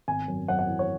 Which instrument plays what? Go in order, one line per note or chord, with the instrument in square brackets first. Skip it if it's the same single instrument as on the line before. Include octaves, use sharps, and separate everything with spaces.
[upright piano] G#1 G#5
F#2
F#2 F#5
F#5
E3
C#5